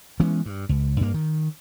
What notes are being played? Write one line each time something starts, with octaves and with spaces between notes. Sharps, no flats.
E3 G#3 B3 C#4
G2
C#2
G2 A#3
D#3